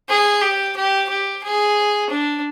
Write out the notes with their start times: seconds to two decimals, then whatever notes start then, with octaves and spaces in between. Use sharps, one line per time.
0.09 G#4
0.41 G4
0.76 G4
1.09 G4
1.43 G#4
2.10 D4